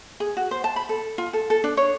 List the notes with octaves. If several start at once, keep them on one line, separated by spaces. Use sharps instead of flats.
G#4
F#4
C5
A5
B5
A4
F4
A4
A4
D4
C#5